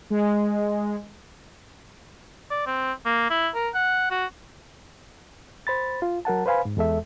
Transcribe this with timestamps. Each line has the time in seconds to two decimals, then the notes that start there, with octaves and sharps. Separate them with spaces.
0.10 G#3
2.50 D5
2.66 C4
3.06 A#3
3.30 E4
3.54 A#4
3.74 F#5
4.11 F#4
5.67 C5 B5 A6
6.02 F4
6.25 F#3 A#4 F#5 A5
6.46 B4 C5 F5 G#5 B5
6.65 G#2
6.77 E2 G#3 A4 E5